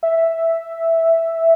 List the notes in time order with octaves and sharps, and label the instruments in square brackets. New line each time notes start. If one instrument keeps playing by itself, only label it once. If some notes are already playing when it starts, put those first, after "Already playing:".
[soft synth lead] E5